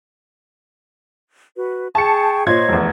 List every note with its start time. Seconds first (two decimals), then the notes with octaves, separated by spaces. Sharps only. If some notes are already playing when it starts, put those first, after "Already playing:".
1.56 F#4 B4
1.95 G#4 G5 A5 C#6 C#7
2.46 A#2 C5 C#5 D#5 G#6
2.69 F1 E2